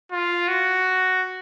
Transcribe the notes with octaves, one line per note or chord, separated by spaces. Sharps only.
F4
F#4